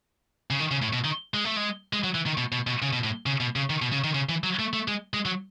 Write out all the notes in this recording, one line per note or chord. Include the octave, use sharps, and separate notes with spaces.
C#3
D#3
C#3
A2
B2
D#3
G#3
A3
G#3
G#3
F#3
E3
D#3
B2
B2
B2
C#3
B2
A2
C#3
B2
C#3
D#3
B2
C#3
D#3
C#3
E3
F#3
A3
A3
G#3
G#3
F#3